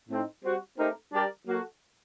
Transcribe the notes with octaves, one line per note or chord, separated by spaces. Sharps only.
A2 A3 C4 D#4
G3 C4 F#4
A3 C4 D#4 G4 A#4
G3 D4 G4 A#4 D5
F#3 A#3 F#4 A4